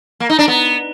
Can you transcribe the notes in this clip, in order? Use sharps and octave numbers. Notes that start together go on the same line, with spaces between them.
A#3
D#4
D4
B3